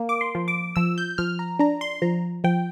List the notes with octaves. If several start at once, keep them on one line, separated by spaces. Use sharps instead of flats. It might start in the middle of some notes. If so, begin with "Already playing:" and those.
Already playing: A#3
D6
C6
F3
D6
F3 E6
G6
F3 F6
A#5
D4 A#5
C6
F3 A#5
F3 G5